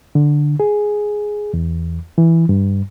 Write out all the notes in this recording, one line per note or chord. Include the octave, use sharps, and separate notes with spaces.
D3
G#4
E2
E3
G2